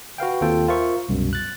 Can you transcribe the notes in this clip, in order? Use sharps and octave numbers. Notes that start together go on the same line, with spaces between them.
F#4 B4 F5 G5
D#2 C4 F4 A4 G5
F4 A#4 C5 E5 C#6
C2 F#2 B2
F#6 A6